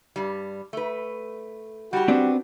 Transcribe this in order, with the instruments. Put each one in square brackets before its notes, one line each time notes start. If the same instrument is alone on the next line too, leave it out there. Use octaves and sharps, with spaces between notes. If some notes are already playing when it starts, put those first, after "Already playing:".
[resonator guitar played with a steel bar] G2 G3
A3 B4
[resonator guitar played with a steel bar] G3 G4 [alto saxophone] F#4
[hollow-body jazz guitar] B3 C4 D4